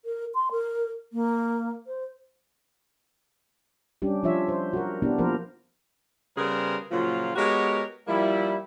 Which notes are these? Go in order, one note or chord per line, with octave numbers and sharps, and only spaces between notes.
A#4
C6
A#4
A#3
C5
G3 C#4 D4 G4
F3 D4 F4 C#5 E5
C5
F#4 A#4
B3 D4 E4 G4
F3 A#3 A#4 C5
C#3 G3 B3 G#4 A#4 C5
A#2 C#3 F3 F#3 A#3 F4
G#3 B3 F#4 G4 A#4 C#5
F3 G3 A#3 E4